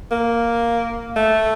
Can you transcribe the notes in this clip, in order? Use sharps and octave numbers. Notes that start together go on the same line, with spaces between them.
A#3
A3